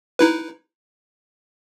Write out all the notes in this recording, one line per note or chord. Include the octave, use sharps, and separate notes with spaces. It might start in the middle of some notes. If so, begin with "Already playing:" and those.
D#4 E4 B4